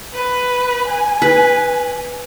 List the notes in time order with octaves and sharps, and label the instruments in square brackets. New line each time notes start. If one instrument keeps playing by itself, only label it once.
[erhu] B4
G#5
[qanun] B4